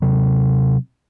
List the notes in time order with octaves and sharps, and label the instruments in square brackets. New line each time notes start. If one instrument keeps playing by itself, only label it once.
[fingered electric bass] C3 F#3